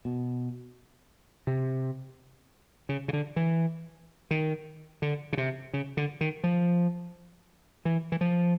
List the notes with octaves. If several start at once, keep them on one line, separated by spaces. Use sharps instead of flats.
B2
C3
C#3
C#3
D3
E3
D#3
D3
C#3
C3
C#3
D3
D#3
F3
E3
E3
F3